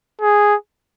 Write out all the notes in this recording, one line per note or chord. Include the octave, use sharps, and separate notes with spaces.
G#4